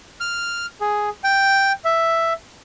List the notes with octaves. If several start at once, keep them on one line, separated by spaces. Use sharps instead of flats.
F6
G#4
G5
E5